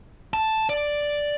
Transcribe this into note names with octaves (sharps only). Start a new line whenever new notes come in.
A5
D5